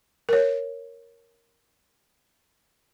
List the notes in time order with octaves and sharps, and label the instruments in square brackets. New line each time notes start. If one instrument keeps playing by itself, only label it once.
[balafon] A#4 C#5